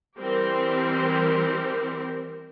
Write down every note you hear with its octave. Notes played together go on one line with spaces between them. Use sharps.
E3 G3 C4 G4 A#4 C5